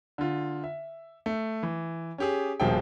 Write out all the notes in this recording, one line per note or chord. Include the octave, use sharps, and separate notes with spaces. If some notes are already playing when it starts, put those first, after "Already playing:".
D3 F4
E5
A3
E3
C#4 G4 G#4
D#1 B2 F3 G#4 E5 G5